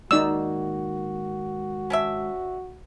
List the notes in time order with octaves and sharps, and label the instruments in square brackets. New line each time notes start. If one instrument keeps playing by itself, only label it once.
[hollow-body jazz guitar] G#2 D#3 A#3 [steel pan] D#4 D5 E6 [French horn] F#4
[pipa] C#4 D4 E5